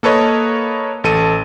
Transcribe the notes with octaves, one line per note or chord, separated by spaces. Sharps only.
A#3 A4 B4 C#5 D#5
A1 A4 D#7